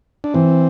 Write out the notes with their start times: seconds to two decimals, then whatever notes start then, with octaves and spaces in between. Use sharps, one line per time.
0.24 D4
0.34 E3 C4